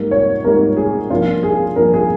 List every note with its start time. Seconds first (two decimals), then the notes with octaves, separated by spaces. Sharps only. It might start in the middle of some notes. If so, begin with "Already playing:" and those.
Already playing: G#2 G3 A#3
0.11 C#5
0.44 G#2 G3 A#3 A#4
0.77 G#4
1.10 G2 F3 A#3 F4
1.43 G#4
1.76 G2 F3 A#3 A#4
1.94 G#4